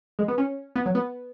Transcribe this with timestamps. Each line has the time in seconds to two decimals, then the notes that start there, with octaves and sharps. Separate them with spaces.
0.19 G#3
0.28 B3
0.38 C#4
0.76 B3
0.86 F#3
0.95 B3